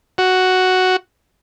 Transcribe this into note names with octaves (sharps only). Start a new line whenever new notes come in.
F#4